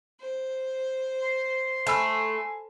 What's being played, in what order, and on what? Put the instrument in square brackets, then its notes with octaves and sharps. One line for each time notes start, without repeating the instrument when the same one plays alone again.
[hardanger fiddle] C5
[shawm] C6
[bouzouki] A3 [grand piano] G#5 B5 E6